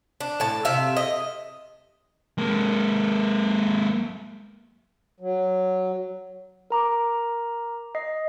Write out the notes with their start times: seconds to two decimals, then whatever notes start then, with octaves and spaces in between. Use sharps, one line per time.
0.21 D4
0.40 A2 A5
0.65 C3 E5 F5
0.97 D#5
2.38 G#3 A#3
5.20 F#3
6.70 A#4 A#5 D6
7.95 D#5 C7